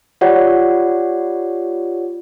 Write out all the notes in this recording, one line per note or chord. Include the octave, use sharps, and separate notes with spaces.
F4 G4 C#5 D5 F#5